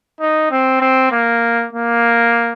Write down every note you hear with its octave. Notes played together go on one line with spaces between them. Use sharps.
D#4
C4
C4
A#3
A#3